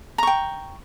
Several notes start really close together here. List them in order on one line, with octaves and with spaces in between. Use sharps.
A#5 C#6 G5